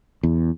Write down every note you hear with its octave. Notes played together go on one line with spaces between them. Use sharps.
E2